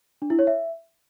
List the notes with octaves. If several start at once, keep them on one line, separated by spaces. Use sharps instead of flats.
D4
E4
C#5
E5